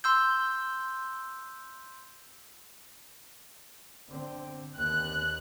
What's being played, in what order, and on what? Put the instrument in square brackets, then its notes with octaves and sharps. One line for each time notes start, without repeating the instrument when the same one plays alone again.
[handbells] C6 E6 G6
[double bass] D3 C4
[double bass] D#2 [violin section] F#6